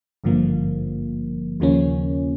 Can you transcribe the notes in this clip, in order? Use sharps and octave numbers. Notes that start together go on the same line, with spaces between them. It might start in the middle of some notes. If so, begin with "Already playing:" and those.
G#1 G2 D3 F3 A#3
D#2 C#3 F3 A#3 C#4